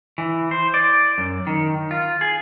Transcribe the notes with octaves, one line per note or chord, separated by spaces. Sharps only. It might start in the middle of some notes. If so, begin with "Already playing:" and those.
E3
C5
D5
F#2
D#3
F4
G#4